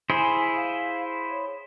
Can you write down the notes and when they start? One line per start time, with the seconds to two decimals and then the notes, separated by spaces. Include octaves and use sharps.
0.10 E4 G#4 C5 G#5
0.55 F5
1.30 C#5